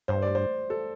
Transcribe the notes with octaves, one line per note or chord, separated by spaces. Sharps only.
G2 C5
D5
C5
A4